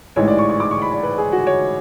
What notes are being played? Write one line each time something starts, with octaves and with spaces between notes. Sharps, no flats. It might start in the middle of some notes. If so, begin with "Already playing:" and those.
A1 G#2 E3 G#3 C#5
D5
C#6
C#6
D6
C#6
B5
D5
B4
G#4
F#4
C#5